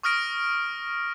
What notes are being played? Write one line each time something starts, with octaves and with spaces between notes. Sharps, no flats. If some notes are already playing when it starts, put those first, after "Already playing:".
C#6 D#6 F6 A#6 D7